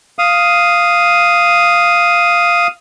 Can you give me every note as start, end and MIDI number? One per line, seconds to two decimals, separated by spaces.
0.19 2.67 77
0.19 2.67 87